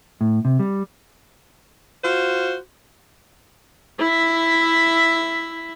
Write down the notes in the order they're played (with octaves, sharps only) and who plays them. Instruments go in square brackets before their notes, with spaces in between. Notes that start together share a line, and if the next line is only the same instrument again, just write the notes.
[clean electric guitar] A2
C3
G3
[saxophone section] F4 F#4 C5
[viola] E4 E5